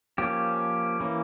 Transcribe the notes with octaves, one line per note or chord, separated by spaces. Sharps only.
F3 A#3 C#4 G4
E3 A#3 C#4